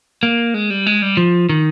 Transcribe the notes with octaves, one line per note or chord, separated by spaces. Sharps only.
A#3
G#3
G3
G#3
G3
F3
D#3